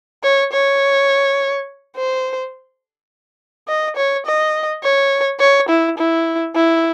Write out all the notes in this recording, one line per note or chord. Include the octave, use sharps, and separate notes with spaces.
C#5
C#5
C5
D#5
C#5
D#5
C#5
C#5
E4
E4
E4